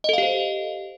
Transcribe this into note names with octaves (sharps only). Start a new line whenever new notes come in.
G4 A4 C5 D#5 F5